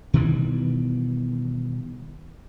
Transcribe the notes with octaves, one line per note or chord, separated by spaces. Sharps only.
B2 D#3 E3 G3